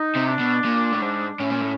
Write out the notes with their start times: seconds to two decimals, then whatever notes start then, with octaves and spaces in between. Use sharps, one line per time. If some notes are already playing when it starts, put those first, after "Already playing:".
Already playing: D#4
0.15 C3
0.27 D4
0.39 B2
0.65 A#2
0.93 A2
1.02 G#2
1.40 A2 C#4
1.50 A#2
1.61 A2